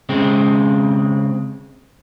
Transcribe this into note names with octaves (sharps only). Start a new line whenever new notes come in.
C#3 G#3 C4